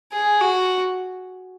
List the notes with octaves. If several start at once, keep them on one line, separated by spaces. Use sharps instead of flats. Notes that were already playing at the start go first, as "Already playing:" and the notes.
G#4
F#4